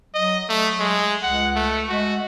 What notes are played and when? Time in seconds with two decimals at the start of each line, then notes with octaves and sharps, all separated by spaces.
0.14 F#3 D#5
0.49 A3
0.80 G#3
1.23 C#2 F#5
1.55 A3
1.89 G#3 F#4